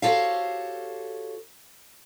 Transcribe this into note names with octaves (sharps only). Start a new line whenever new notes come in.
F#4 G4 A4 C5 C#5 F5